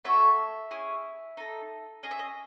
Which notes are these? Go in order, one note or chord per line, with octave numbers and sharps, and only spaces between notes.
A3 C#4 F#4 A4 E5
C#4 E4 G#4
D#4 A4
C#4 G#4 D#5
E5
D#5